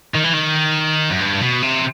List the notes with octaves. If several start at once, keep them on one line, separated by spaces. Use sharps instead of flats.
D#3
E3
D#3
F#2
G2
B2
C3